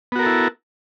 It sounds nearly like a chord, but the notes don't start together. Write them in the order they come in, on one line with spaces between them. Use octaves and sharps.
B3 F#4 A#4 A4 E4